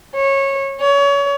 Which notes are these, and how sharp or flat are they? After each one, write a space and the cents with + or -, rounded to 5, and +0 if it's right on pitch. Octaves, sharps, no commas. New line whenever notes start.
C#5 -20
C#5 +30